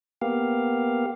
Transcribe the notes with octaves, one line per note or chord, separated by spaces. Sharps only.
A#3 B3 G4 F5